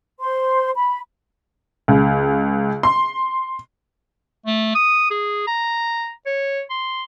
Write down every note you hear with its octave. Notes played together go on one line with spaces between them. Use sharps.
C5 C6
B5
C#2
C6
A3
D#6
G#4
A#5
C#5
C6